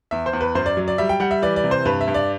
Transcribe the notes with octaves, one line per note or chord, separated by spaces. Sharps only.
E2 E5
C5
E2
B4
F#2 C5
D5
F#3
D5
G3 E5
G5
G3 F#5
E5
E3 D5
D5
C3
C5
G2 B4
E5
G2
D5